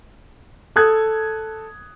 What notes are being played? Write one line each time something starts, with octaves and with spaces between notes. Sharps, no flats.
A4 D#6 F#6 G#6